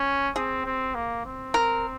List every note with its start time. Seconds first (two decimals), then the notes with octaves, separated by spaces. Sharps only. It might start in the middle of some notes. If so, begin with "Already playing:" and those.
Already playing: C#4
0.36 C4 G#4
0.65 C4
0.95 A#3
1.25 C4
1.54 A#4